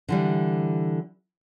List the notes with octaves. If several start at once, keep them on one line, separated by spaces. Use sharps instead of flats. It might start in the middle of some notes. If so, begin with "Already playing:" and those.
D3 E3 G3